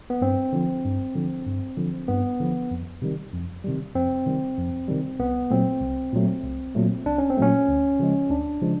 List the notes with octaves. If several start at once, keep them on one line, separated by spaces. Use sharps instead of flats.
B3
G2 C4
D3 F3
G2
D3 F3
G2
D3 F3
G2 B3
D3 F3
F2
C3 D#3 G3
F2
C3 D#3 G3
F2 C4
C3 D#3 G3
F2
C3 D#3 G3
C2 B3
A#2 F#3 A3 C4
C2
A#2 F#3 A3
C2
A#2 F#3 A3
C2 D4
C#4
C4
A#2 F#3 A3 C#4
D2
C#3 F3 G#3
D2 D4
C#3 F3 G#3